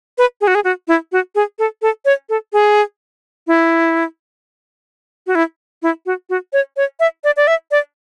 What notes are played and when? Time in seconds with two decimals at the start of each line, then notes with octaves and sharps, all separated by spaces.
0.18 B4
0.41 G#4
0.47 F#4
0.55 G#4
0.64 F#4
0.88 E4
1.12 F#4
1.35 G#4
1.59 A4
1.82 A4
2.05 C#5
2.29 A4
2.53 G#4
3.47 E4
5.27 F#4
5.35 E4
5.82 E4
6.06 F#4
6.30 F#4
6.53 C#5
6.77 C#5
7.00 E5
7.24 D5
7.37 D5
7.47 E5
7.71 D5